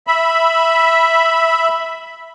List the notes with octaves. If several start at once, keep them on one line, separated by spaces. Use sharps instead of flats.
E5 B5